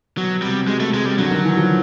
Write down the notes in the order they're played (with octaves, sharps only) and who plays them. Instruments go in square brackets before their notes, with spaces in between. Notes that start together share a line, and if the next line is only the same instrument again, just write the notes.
[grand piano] B2 [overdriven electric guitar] F#3
[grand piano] C3 [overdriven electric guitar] G3
[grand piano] B2 [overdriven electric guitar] G#3
[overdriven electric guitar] A3
[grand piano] C3 [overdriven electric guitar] G#3
[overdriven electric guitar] G3
[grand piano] D3 [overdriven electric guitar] F#3
[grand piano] D#3
E3
F3